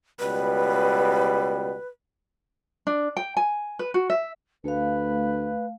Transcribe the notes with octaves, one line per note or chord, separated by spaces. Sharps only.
C#2 B2 G3 B4
D4
G5
G#5
B4
F#4
E5
D2 A3 B4 F5